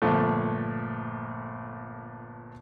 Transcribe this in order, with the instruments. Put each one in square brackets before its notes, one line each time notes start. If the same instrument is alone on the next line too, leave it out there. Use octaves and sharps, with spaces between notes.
[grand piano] G1 A#2 F3 A3